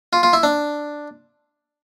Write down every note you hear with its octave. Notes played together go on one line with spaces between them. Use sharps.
F4
F4
E4
D4